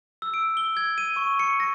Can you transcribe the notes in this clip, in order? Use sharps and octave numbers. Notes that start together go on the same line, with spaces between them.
E6
D7
G7
G#6
D#7
C#6
C#7
A#6